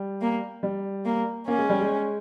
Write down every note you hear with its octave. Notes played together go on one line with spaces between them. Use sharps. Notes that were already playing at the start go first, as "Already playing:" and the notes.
Already playing: G3
A#3
G3
A#3
A#3 C#4
G#3
G3
G#3